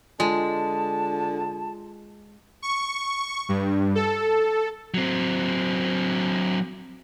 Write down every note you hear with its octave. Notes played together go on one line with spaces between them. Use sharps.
D3 G#3 F4 A5
C#6
G2
A4
F#3 C4